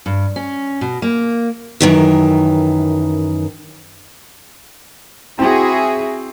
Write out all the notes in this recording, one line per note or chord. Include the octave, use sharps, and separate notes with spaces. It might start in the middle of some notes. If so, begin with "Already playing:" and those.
G2
C#4
B2
A#3
F#2 D#3 E3
C4 E4 F#4 G#4